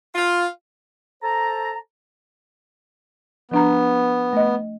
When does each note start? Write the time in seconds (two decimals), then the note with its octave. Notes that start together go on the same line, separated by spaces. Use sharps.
0.15 F4
1.22 A4 C5 A5 A#5
3.51 F3 B3 D4 A#5
4.33 A3 D#5